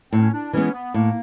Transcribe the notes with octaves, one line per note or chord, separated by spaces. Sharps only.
A2 C4
C#4
D4
E3 G#3 B3 C#4
B3
A2 A#3